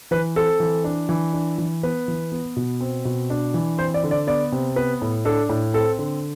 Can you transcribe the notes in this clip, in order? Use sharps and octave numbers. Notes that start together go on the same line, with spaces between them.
E3 B4
C4 A4
E3
D4
E3
D4
E3
B3 B4
E3
B3
B2
C4
B2
D4
E3
C4 C5
D5
D3
D5
B3 D5
C3
B3 B4
A2
D4 A4
A2
C4 A4
D3